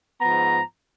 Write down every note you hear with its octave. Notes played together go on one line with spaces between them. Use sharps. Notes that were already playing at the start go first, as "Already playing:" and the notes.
G#2 F3 B3 A#5